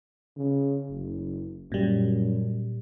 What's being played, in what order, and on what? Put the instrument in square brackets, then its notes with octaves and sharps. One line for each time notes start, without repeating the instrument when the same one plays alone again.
[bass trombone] C#3
F#1
[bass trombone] F#2 [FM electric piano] A#2 G3